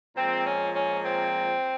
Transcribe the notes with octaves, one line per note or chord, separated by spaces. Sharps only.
A#2 F3 G#3 C4
C#4
C#4
C4